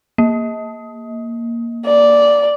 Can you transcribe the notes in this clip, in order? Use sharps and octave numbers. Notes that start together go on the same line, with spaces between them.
A#3
D5